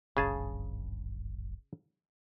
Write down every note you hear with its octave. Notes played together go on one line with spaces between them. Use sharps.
D1 G#1 G2 C#3 G#4 A5